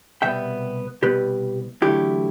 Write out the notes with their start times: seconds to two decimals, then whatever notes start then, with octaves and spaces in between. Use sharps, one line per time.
0.22 C2 B2 G3 B3 E5 G5
1.02 C2 B2 G3 B3 G4 B4
1.82 E2 D3 F#3 A3 E4 G4